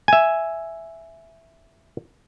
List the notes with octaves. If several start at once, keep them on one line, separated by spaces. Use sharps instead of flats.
E5 G#5